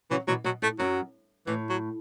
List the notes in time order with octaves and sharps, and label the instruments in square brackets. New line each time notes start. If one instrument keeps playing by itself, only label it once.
[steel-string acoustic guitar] C#3 F#3 [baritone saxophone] E3
[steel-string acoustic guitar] B2 E3 [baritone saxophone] F#3
[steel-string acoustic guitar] B2 [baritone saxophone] F#3
[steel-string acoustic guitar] A2 [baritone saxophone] A3
[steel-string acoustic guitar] F#2 [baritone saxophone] F#3
[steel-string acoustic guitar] A2 [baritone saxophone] E3
[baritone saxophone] F#3